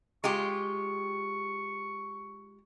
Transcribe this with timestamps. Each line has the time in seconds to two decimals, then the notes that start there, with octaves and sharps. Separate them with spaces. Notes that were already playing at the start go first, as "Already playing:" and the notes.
0.24 G#3 F4 G4 C#6